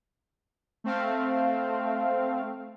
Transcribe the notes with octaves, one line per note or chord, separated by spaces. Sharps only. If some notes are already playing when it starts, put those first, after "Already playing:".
A3 C4 F5